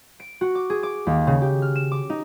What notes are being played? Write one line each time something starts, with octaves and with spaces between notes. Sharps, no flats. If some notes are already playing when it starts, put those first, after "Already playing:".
D7
F#4
D6
G#4
D6
D#2
C#3
G4
F6
E7
D6
D#4